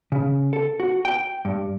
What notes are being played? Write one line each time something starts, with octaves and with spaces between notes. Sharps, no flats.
C#3
A4
F#4
G5
G2